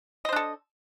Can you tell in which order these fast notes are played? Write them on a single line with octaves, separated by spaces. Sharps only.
D#5 C5 D4 A4